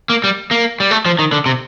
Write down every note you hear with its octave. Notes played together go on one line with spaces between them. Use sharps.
A#3
G3
A#3
G3
A3
F3
D#3
D3
C3